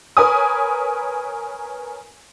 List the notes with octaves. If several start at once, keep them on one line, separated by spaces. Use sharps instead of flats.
A#4 B4 C#5 G#5 D#6